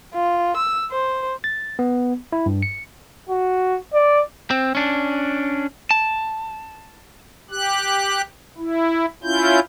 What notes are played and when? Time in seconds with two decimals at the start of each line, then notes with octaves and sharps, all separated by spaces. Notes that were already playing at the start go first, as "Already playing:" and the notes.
0.13 F4
0.57 E6
0.91 C5
1.44 A6
1.79 B3
2.33 E4
2.46 G2
2.62 C#7
3.29 F#4
3.94 D5
4.51 C4
4.75 C#4 D4
5.91 A5
7.51 G4 F#6
8.58 E4
9.24 C#4 E4 F4 G6